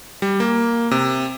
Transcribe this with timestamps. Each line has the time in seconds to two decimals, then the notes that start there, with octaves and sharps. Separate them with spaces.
0.22 G3
0.40 A#3
0.91 C3